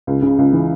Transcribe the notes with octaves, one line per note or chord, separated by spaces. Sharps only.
C#2
C#3
C#2
E3